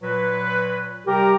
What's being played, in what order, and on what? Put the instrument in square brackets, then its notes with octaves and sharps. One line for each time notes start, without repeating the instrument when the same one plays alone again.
[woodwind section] A#2 F#3 B4
[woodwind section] C3 G3 A#4 [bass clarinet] G4